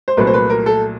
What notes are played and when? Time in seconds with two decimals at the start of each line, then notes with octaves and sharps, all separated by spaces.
0.08 C5
0.17 C2 A#2 F#3 A3 B4
0.27 C5
0.34 B4
0.50 A#4
0.66 A4